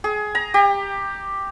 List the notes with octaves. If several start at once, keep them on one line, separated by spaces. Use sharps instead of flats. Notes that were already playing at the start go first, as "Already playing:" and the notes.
G#4
A#5
G4